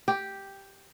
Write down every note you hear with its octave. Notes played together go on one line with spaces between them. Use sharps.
G4